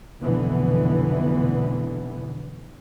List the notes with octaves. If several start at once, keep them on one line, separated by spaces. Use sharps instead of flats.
F1 B1 B2 D3 E3 B3